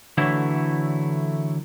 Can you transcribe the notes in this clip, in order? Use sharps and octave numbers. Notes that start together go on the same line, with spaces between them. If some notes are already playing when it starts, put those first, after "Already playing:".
D3 E3 F#3 A3 E4